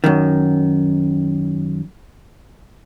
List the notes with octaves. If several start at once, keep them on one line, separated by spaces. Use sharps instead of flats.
F#2 D#3